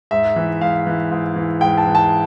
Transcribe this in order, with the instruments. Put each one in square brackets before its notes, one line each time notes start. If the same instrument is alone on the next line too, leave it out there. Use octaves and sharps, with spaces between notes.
[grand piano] G#2 E5
E3
G#2 F5
E3
G#2
E3
G#2 G5
A5
E3
A5